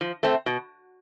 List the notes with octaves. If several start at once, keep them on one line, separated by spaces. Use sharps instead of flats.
F3
A3 C4
B2